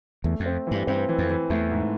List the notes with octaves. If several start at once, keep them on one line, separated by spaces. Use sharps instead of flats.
E2 A3
F2
C4
G2 E3
G2 C4
E3
F2
E3
E2 A3
G#2